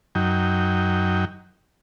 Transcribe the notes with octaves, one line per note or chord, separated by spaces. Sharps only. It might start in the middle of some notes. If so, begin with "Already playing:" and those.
F#2 F#3 D#4 G5